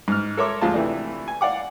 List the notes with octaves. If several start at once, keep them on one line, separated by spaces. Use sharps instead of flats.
G#2 F6
A4 A#4 C#5 E5 C6 D6
D2 F3 G#3 F4 A5
C3 E3 A3 D4
G#5
D5 F5 F#5 D6